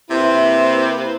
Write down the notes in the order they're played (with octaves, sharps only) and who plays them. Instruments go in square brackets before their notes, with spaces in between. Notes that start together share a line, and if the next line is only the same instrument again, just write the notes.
[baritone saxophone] C3 [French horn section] A#3 E4 [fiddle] B4 C5 [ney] E5